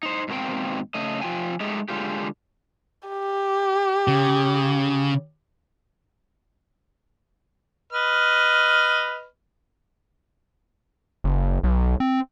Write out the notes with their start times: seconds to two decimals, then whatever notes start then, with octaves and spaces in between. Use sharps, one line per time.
0.03 D#4 C5
0.28 G#2 B2 D#3 A#3 C4 G5
0.94 C#3 A3 D#5
1.21 F3 F4 G5 G#5
1.60 G#3 A3 D#4 G4 G#4
1.88 D3 G#3 F4 G4
3.09 G4
4.08 C#3
7.93 B4 D#5 F6
11.24 F#1
11.64 B1
12.00 C4